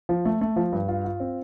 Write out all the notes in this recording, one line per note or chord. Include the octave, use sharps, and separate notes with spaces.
F3
A3
A3
F3
G2
F4
F4
C4